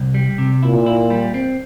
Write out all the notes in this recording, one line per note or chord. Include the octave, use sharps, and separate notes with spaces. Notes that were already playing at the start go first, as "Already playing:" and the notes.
Already playing: C2
G3
C3
A#2 E4
E4
G3
C4